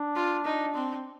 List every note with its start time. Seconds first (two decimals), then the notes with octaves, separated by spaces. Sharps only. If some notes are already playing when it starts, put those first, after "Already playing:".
Already playing: D4
0.15 F4
0.45 D#4
0.74 C4